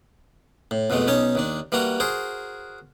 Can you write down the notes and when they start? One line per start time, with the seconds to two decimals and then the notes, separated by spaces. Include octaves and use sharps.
0.71 A2
0.90 F2 B2 E3 G#3 A3
1.08 B1 C#4 D#4 C#5 A5
1.35 D#2 D#3 D4
1.72 E3 G3 A#3 F#4 A#5
2.00 F#4 G#4 A#4 C5